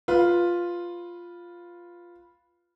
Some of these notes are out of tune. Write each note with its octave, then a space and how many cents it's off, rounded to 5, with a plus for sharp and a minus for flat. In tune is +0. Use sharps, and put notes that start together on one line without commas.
F4 +0 B4 -5